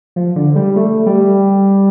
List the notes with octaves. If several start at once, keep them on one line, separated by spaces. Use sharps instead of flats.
F3
D3
G3
A3
G3